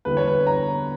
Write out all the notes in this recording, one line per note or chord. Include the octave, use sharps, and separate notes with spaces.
E2 D3 G3 B3 E4 B4
C#5
B4
A#5